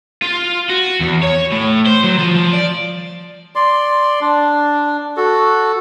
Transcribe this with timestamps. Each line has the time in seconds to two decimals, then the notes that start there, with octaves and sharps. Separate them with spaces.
0.22 F4
0.70 F#4
1.00 E2
1.23 C#5
1.52 A2
1.86 C5
2.04 F#3
2.18 F3
2.35 F3
2.53 D5
3.55 D5 C6
4.21 D4
5.17 F#4 A4